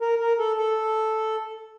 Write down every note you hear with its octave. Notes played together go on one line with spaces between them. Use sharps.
A#4
A#4
A4
A4